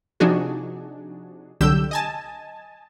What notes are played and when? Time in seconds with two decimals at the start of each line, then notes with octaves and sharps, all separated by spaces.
0.20 C3 F3 D4 D#4 F#4 G#4
1.61 C2 D3 F#3 G4 E6 G6
1.91 D#5 G#5 A5